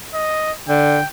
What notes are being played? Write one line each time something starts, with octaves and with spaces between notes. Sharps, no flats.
D#5
D3 G5